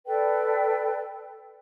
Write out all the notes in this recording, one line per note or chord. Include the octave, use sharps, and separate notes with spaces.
A4 B4 D5 G5